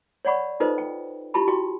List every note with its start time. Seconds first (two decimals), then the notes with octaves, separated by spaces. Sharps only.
0.25 C#5 D5 F#5 B5 C#6
0.60 D#4 F4 A4 B4 C5 D#5
0.78 G5
1.34 E4 F4 G4 A5 B5
1.47 E4 F#4 G5 C#6